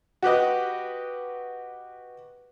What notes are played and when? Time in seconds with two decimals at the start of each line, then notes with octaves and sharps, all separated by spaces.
0.22 F#4 G4 B4 D#5